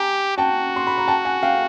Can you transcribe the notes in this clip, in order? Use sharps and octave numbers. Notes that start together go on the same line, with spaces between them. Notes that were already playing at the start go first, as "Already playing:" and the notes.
Already playing: G4 G#5 A#5
F#4 G5 A5
C6
B5
A#5
G5 A5
F#5 G#5
F5 G5